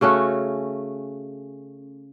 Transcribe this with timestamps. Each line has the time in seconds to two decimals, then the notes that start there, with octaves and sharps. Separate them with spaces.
0.01 C#3 A3 C#4 F#4